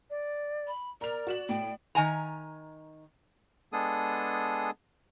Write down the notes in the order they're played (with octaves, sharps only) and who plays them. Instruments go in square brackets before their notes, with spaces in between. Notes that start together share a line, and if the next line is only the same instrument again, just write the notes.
[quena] D5
[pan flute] B5
[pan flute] A#4 [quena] D5 [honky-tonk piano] A#5 F7
[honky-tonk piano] F#4 E7 F#7
[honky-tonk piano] A2 [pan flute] G5
[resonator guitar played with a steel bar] D#3 G#5 A#5
[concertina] G#3 B3 D4 G#4 A4 D#6